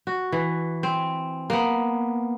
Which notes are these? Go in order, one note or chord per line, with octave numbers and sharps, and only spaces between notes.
F#4
E3
C4
A#3 B3